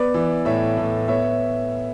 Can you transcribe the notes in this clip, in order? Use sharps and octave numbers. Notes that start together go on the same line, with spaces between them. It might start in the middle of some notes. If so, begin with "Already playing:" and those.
Already playing: B3 B4 D5
E3
A2 C#5 E5
A2
B3 C#5 E5